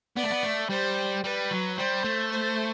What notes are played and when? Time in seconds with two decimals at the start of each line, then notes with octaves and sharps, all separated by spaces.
0.16 B3 D5
0.23 A3
0.30 B3
0.43 A3
0.70 G3 C5
1.24 G3 B4
1.51 F#3
1.78 G3 C5
2.04 A3
2.31 C5